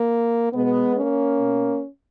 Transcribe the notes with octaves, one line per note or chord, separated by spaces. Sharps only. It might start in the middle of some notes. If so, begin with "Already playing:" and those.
Already playing: A#3
B2 G#3 B3
A#3 C#4
B2